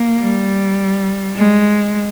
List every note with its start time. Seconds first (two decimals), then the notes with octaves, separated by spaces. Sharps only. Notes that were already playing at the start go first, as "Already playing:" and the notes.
Already playing: A#3
0.19 G3
1.36 G#3